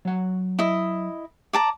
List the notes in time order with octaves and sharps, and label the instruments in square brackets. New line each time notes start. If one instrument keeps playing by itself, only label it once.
[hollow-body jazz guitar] F#3 F#5
[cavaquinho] E4 D#5
D5 A5 A#5